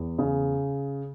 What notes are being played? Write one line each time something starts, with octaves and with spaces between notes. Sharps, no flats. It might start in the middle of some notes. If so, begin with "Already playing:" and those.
Already playing: E2
C#3